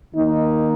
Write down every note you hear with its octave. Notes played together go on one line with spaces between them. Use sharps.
D#3 A#3 D#4